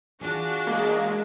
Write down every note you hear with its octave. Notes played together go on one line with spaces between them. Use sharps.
E3 D4 F4 F#4 G#4
G#3 A#3